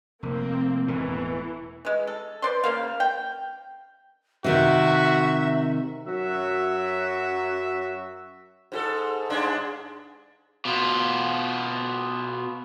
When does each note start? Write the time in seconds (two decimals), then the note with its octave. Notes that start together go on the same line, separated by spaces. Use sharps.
0.23 F1 A#3 C4
0.88 E1 A2 E3
1.85 E3 G#3
2.07 A4
2.42 B4 C5 D5 C6
2.64 C#3 A#3 F5
3.00 G5
4.44 C3 D#3 F#4 E5
6.06 F#2 F#3 F#4 E5
8.72 G#2 F#4 A4
9.30 G2 G#3 D4
10.65 B2 F4